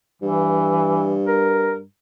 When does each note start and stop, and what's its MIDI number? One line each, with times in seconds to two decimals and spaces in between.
0.22 1.84 43
0.22 1.18 52
1.26 1.77 70